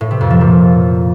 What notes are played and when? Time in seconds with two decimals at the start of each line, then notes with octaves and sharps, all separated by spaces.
0.01 A2
0.11 C3
0.21 F2
0.31 F3
0.41 A#2